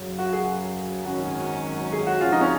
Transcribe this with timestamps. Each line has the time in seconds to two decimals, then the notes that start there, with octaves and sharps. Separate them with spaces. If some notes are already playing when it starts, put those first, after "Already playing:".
Already playing: F#2 C#3 F#3
0.18 F#4
0.33 G#4
1.05 G#1 F#2 D#3 F#3 C#4 F#4
1.92 G#4
2.07 F#4
2.21 C#2 C#3 F3 F4
2.32 D#4
2.41 C#4